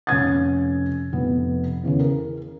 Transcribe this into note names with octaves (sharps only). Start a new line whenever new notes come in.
F1 C#4 G#6 A6
F1 B3
E2 C#3 E3
A#4